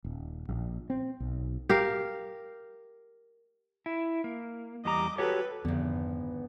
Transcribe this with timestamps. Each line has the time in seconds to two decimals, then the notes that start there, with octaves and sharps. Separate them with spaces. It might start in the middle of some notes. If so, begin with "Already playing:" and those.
0.04 D#1
0.49 A#1
0.90 C4
1.20 B1
1.69 G4 A#4 F5
3.86 E4
4.24 A#3
4.85 E2 G3 D#5 A#5 D6
5.18 F#4 G4 A4 B4 C#5
5.65 G#1 F2 D3 B3